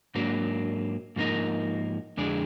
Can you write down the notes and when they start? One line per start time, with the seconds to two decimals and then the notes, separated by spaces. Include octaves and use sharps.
0.15 G#2 F#3 A#3 D4
1.16 G#2 F3 A#3 D#4 A#4
2.17 F2 D3 G#3 D4 G#4